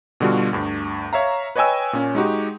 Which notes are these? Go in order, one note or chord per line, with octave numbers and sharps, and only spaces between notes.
B2 D3 G3 F4 F#4
D2 G2
C#5 E5 F5 A#5
B4 C#5 D#5 G5 G#5 E6
A#2 C#4
G#3 D#4 F#4 G4